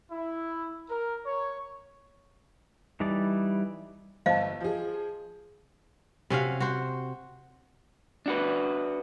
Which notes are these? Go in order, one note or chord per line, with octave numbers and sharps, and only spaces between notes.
E4
A#4
C#5
E3 G3 D#4 D5 A5
G1 C5 D#5 F5 A5
F3 G#4
C3 C#4 F#4 F5
F#4 C5
D4 F#4 B4